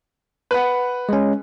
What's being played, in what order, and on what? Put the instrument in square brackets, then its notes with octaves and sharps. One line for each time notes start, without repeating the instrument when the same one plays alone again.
[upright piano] B4 F#5
[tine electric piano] G#3 C#4